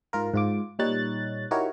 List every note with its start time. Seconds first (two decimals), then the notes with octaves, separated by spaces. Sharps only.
0.13 G#2 F4 A#4
0.34 G#2 F4 D6
0.79 A#2 G3 D#4 C#5 F#6 A6
1.51 D#4 E4 F#4 G4 A#4 C#5